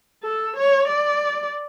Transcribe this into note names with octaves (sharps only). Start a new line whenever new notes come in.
A4
C#5
D5